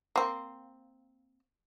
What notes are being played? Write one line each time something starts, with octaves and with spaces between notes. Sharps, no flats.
A#3 C4